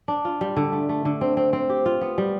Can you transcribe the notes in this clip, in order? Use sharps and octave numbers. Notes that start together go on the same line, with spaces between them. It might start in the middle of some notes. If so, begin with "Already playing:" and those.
D4
F4
G3
D3
A3
A3
D3
C4
C4
C4
G4
F4
B3
G3